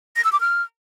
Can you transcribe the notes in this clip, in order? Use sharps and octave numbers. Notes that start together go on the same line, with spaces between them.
A#6
E6
D6
F6